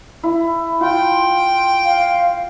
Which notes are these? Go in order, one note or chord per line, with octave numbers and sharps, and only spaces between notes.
E4
F4 G5
F5